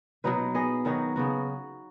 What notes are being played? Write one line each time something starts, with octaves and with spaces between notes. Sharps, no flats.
B2 F#3 D#4 B4
B3 G#4 D#5
D#3 F#3 D#4 F#4
C#3 B3 F#4